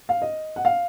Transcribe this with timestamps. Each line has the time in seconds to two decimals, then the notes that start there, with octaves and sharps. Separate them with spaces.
0.09 F5
0.22 D#5
0.56 F#5
0.65 F5